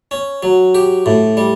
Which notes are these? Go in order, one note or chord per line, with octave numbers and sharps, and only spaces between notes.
C#4
F#3
G4
A2
G3